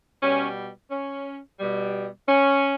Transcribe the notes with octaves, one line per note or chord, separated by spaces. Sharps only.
B2 G3 C#4
C#4
B2 G3
C#4